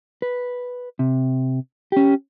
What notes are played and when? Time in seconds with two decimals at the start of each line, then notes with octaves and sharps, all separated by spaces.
0.22 B4
0.99 C3
1.92 C#4 G4